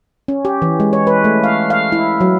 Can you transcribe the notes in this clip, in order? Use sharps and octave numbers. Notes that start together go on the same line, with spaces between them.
C#4
G4
E3
G#3
C#5
B4
A3
F5
F5
E4
F#3